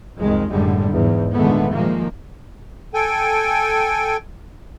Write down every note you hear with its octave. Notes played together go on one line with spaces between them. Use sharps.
C2 F2 D#3 G#3
F#1 F#2 A2 D3 G3 G#3
E2 G#2
A#2 D3 D#3 G#3 A3 B3
A#2 D#3 F3 G#3 A#3
A4 G5 G#5